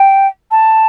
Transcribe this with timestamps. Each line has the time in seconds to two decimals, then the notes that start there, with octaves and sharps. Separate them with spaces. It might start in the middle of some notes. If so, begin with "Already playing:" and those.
Already playing: G5
0.51 A5